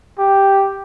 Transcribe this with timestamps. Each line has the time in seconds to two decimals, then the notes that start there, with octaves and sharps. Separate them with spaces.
0.19 G4